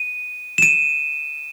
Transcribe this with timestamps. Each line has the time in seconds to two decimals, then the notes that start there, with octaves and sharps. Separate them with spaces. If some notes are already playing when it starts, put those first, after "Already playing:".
Already playing: D#7
0.58 E7
0.62 D#7